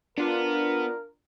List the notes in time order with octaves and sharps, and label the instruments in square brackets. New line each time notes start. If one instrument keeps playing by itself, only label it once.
[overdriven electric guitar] B3 [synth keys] D4 F4 [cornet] A#4